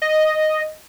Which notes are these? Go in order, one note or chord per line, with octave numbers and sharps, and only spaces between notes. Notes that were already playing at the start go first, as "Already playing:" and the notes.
D#5